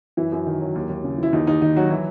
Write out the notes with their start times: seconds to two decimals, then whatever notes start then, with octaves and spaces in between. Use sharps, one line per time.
0.17 F#2 E3 E4
0.32 F#2
0.46 D#3
0.61 F#3
0.75 D#2
0.89 D#2
1.04 C#3
1.18 E3 E4
1.33 D#2 D#4
1.47 D#2 D#4
1.62 D#3 D#4
1.76 F#3 F#4
1.90 E3 E4